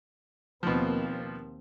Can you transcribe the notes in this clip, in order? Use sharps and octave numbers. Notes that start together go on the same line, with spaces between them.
D#2 B2 F3 A#3 C4